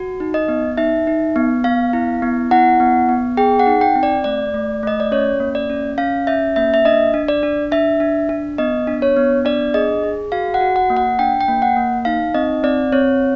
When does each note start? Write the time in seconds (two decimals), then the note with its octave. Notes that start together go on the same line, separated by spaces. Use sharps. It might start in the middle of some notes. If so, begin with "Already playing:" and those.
Already playing: F#4
0.20 D#4
0.34 D#5
0.48 B3
0.77 D#4 E5
1.07 D#4
1.36 B3
1.64 B3 F5
1.93 E4
2.22 B3
2.51 E4 F#5
2.80 B3
3.09 B3
3.37 G#4 G5
3.59 F#5
3.67 D#4
3.81 G5
3.96 C4
4.03 D5
4.24 A3 D5
4.54 A3
4.83 A3 D#5
5.00 D5
5.11 C#4 C#5
5.40 A#3
5.55 D5
5.70 C#4
5.98 C#4 F5
6.27 C#4 E5
6.56 A#3 E5
6.74 E5
6.85 D4 D#5
7.14 D4
7.28 D5
7.43 D4
7.71 D4 E5
8.00 D4
8.29 D4
8.58 B3 D#5
8.87 D4
9.02 C#5
9.17 B3
9.45 D4 D5
9.74 G#4 D#5
10.03 G#4
10.32 F#4 F5
10.54 F#5
10.61 F#4
10.76 F#5
10.90 A#3
10.97 F#5
11.19 D4 G5
11.41 G5
11.48 A#3
11.62 F#5
11.76 A#3
12.05 D#4 F5
12.34 C4 D#5
12.64 C4 D5
12.92 C4 C#5